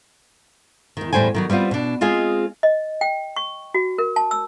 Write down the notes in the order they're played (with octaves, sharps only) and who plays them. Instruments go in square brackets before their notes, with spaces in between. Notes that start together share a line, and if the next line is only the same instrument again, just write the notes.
[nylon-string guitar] E2 D#3
E2 A2 G3 C5 G5 G#5
D#3 F#3 G3
G3 B3 C4 F4
B2 D4
G#3 C4 F4 G#4 D#5 G#5
[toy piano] D#5
G5
C#6
F#4
A#4
A5
E6